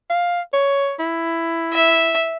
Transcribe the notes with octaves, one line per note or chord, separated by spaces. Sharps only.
F5
C#5
E4
E5